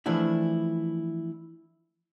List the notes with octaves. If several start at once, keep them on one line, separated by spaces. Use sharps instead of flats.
E3 F3 A3 D4 E4